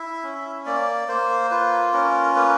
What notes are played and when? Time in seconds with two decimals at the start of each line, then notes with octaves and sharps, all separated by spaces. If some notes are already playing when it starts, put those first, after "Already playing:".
Already playing: E4 E5
0.23 C#4
0.66 A#3 D5
1.08 A#3 C5
1.51 F4 B4
1.93 C#4 A#4
2.36 A#3 B4